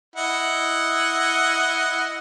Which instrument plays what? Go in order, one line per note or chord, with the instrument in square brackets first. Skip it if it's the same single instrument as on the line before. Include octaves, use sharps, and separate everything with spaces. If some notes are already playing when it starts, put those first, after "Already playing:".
[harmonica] E4 D#5 F#5